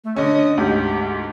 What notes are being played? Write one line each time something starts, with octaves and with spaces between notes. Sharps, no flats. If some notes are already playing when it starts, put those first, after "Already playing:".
A3
D3 C#4 D#5
D2 G#2 G4